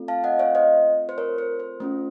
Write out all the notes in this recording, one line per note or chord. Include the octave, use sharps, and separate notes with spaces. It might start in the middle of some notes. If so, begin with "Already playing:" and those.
Already playing: A3 C4 F4 A4
F5 A5
D#5 F#5
C#5 F5
C5 D#5
C5
A#4 C#5
C5
C5
A3 C#4 F4 C5